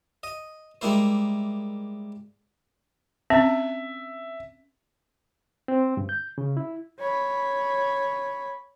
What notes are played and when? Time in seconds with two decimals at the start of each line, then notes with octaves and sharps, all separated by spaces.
0.23 D#5
0.81 G3 G#3 A#3 E4 C5
3.30 C4 C#4 E5
5.68 C4
5.97 G2
6.09 G6
6.38 C#3
6.57 E4
6.99 C#5 B5